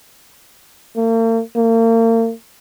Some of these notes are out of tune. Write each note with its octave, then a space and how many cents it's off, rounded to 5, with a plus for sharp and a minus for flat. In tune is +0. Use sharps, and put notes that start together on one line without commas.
A#3 -45
A#3 -40